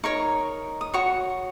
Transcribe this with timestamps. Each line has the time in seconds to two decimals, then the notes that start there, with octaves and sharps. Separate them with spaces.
0.04 D#4 A#4 C#5 C#6
0.81 D#6
0.94 F#4 C#5 C#6